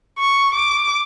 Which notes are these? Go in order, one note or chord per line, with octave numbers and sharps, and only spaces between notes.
C#6
D6